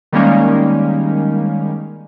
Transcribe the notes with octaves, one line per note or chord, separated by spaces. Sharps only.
D#3 G3 G#3 A#3 C#4 D#4